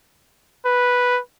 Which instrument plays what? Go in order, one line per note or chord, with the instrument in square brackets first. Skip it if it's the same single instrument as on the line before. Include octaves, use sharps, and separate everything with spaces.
[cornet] B4